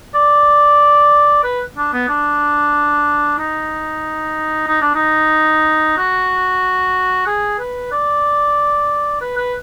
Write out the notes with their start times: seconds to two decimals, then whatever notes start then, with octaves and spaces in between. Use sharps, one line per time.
0.15 D5
1.44 B4
1.77 D4
1.93 B3
2.09 D4
3.39 D#4
4.67 D#4
4.82 D4
4.95 D#4
5.98 F#4
7.27 G#4
7.59 B4
7.92 D5
9.21 B4
9.37 B4